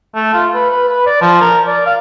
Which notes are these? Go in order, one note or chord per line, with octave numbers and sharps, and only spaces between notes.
A3
F4
B4
B4
B4
D5
F3
A#4
D5
F5